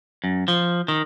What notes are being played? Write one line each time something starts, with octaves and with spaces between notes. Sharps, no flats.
F#2
F3
D#3